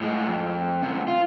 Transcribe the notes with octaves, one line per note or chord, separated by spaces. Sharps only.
A2 G#3
F2
D2 C3
F4